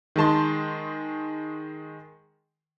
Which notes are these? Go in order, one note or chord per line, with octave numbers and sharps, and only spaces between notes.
D#3 G#3 A5 C6